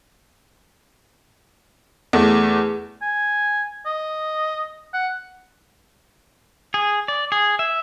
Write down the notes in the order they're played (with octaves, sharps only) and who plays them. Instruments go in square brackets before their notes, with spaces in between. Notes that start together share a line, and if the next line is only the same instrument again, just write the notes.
[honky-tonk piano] E2 A3
[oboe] G#5
D#5
F#5
[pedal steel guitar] G#4
D5
G#4
E5